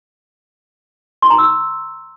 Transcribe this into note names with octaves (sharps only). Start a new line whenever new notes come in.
C6
A#5
E6